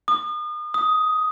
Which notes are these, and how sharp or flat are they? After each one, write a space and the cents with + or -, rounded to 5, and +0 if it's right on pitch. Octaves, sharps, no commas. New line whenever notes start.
D#6 -35
D#6 +10